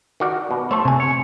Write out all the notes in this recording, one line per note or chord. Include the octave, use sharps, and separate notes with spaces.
D#3 F#4 D5
B2
A3 A4 C5 C#5
C3 C5 G#5
C#5